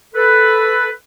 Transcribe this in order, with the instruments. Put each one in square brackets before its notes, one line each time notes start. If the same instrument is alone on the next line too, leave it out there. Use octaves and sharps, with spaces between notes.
[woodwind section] A4 B4